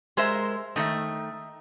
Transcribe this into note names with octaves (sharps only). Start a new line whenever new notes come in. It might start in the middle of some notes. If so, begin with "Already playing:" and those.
G#3 A#4 C5 E5 A#5 C6
D#3 A3 D#5 E5